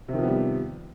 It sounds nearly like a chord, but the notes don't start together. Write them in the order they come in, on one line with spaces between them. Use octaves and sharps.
C3 D#3 F3 B3 G3